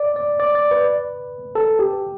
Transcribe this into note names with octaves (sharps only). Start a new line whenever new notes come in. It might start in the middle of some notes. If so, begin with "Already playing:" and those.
Already playing: D5
D5
D5
D5
B4
A4
G4